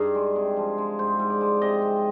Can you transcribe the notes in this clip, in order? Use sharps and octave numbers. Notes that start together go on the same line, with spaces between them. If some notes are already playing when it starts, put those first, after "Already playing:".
Already playing: G2 D#4 G#4
G#3
C3
F3
G#3
G#2 C5
G#2
D5
G#3
C3 D#5
C3